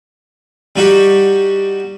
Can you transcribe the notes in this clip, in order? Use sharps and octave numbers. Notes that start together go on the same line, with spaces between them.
G3 D#4 F#4 G4